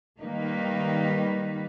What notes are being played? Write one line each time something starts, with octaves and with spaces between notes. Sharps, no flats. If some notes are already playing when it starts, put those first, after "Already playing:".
D#3 G3 A#3 D#4 B4